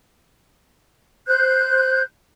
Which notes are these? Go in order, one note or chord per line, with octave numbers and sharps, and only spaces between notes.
C5 F#6 G6